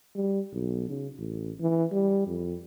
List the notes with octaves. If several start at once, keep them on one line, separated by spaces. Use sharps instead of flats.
G3
B1
C#3
A1
E3
G3
F2